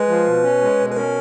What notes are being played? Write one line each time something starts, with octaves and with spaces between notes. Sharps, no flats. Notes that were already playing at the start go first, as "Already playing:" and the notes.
Already playing: G#3 B4
F3
B2
C#4
G#3
B2
B4
C#4 A#4